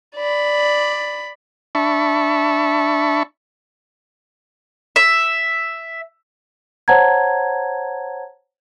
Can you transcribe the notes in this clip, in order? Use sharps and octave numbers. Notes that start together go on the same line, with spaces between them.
D5 B5
D4 E5 A5 B5 C#6
E5
C5 C#5 F#5 A5 A#5 G#6